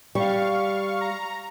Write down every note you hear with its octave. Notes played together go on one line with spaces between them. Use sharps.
G3 F5 C#6
A#5